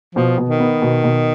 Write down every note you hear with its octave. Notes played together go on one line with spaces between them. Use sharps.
B2 F3
B2
D#3
B3
B2
B2